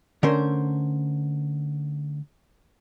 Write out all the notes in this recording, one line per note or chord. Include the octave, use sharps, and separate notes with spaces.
D3 A3 C#4 A#4 C5